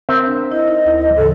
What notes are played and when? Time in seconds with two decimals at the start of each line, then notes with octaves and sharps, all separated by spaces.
0.09 C4 A#4 E5
0.26 D4
0.52 E4 D#5
0.68 D#4
0.85 D2 E4
1.16 G#2 C#3 E3 A4